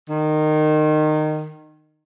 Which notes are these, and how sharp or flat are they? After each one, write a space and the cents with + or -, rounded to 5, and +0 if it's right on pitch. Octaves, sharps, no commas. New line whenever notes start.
D#3 -20